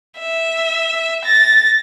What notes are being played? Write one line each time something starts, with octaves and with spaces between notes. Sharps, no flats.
E5
A6 A#6